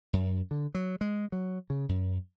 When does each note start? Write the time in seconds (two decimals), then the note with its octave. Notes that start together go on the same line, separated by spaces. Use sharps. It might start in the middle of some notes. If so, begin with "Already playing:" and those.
0.13 F#2
0.51 D3
0.75 F#3
1.01 G#3
1.32 F#3
1.70 C#3
1.89 F#2